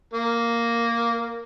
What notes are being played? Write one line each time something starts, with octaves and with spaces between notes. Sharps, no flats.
A#3